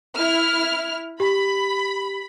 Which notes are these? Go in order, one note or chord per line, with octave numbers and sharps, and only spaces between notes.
E4 F6
G4 B5